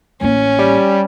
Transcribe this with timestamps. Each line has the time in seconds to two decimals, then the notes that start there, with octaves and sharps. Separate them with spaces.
0.21 A1 A#3 C#4
0.59 G3